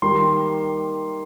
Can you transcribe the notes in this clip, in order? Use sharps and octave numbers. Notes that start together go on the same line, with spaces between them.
D#3 G3 A#3 C6